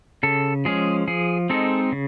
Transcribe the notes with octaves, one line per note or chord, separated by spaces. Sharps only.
C#3 A4
F3 G#3 C#4 G#4
F3 G#4
G#3 C4 D#4 A4
C#3